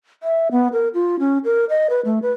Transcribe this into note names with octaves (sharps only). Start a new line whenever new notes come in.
E5
B3
A#4
F4
C#4
A#4
D#5
B4
A3
B4